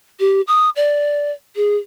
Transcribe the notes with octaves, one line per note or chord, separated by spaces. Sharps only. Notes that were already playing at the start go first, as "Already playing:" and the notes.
G4
D#6
D5
G#4